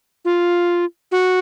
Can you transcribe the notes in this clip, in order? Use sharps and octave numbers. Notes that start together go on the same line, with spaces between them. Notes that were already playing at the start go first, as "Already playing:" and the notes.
F4
F#4